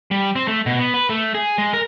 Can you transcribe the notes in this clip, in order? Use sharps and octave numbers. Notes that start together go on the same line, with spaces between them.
G3
C4
A3
B2
B3
B4
A3
G#4
G#3
A#4